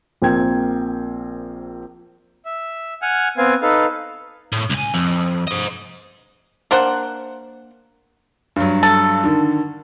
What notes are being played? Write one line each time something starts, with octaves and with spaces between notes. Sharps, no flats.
A#1 A#3 C4 G5 G#6
E5
F#5 G#5 F6
B3 C4 F5 G#5
D#4 A4 B4 F5
A2
C#2 G#5
F2
C5 D#5
A#3 D4 C5 F#5
G2 F#3
A4
D3 D#3